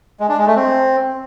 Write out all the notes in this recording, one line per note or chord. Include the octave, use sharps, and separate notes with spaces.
G#3
D4
G#3
A3
C4